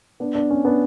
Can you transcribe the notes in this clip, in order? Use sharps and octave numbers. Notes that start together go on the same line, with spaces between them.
B3 D4
B3 D4
C#4
B3 D4